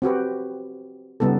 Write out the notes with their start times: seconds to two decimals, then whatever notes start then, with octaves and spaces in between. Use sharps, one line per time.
0.02 C4 F#4 G4 B4
1.20 C#3 G3 B3 D#4 A4